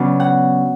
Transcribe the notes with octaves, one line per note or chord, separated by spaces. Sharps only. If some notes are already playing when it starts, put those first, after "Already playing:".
Already playing: C#3 F#3 B3 D4
F#5